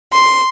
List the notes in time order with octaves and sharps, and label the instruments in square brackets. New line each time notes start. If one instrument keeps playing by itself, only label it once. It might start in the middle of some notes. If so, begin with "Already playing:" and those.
[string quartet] C6